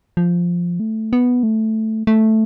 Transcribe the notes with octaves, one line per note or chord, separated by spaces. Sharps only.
F3
A3
B3
A3
A3